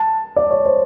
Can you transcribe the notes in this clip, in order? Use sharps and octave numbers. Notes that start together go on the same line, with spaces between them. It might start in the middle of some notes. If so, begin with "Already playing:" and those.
Already playing: A5
D5
C#5
C5